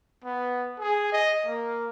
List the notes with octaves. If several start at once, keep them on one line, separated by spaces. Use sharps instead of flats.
B3
G#4
D#5
A#3